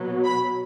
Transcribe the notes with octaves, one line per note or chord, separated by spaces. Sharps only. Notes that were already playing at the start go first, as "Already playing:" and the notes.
Already playing: B2 F#3 B3
B5